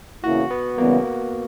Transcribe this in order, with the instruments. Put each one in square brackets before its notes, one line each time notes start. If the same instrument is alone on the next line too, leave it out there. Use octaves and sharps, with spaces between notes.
[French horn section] E2 C#3 E3 A#3 E4 [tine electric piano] F#4
[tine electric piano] B3
[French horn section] C#3 E3 G3 B3 [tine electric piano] A#3